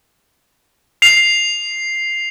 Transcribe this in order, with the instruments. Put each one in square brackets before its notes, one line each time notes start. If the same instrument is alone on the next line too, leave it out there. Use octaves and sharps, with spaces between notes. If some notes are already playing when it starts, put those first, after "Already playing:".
[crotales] C7 F7